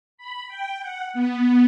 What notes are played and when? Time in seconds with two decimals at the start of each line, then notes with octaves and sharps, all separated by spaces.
0.18 B5
0.48 G5
0.81 F#5
1.14 B3